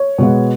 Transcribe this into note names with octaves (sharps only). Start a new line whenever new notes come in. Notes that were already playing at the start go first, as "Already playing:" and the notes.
Already playing: C#5
B2 G#3 B3